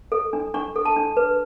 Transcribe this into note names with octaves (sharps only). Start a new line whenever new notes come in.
A4
D4
D4 C#6
A4
A5
D4
B4